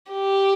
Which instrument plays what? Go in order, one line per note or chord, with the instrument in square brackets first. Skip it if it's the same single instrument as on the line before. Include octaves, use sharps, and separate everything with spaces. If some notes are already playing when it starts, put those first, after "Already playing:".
[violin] G4